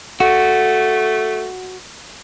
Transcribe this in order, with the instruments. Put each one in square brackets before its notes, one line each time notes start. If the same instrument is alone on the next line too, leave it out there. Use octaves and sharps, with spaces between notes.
[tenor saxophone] A3 [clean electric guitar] F#4